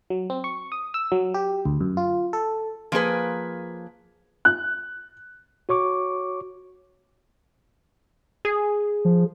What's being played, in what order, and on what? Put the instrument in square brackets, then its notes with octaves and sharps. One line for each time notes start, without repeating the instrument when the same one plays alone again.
[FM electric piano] F#3
C4
C#6
D#6
E6
F#3
G4
D2
F#2
F4
A4
[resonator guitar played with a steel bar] F3 A#3 G#4 B4
[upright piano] F#6
[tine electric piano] F#4 C#5 C#6 D6
[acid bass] G#4
[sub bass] F3